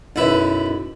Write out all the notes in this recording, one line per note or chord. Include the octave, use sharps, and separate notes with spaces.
B1 F#2 E4 B4